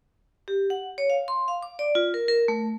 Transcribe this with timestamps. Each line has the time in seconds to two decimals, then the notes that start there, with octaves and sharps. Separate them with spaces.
0.48 G4
0.70 F#5
0.98 C#5
1.10 F5
1.28 C6
1.48 F5
1.62 D6
1.79 D5
1.95 F4
2.14 A#4
2.28 A#4
2.48 A3